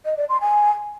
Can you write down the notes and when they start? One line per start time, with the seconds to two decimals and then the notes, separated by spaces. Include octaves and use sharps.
0.05 D#5
0.17 D5
0.29 C6
0.41 G#5